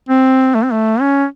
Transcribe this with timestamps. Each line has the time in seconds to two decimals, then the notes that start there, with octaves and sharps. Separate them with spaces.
0.09 C4
0.55 A3
0.64 C4
0.72 A3
1.01 C#4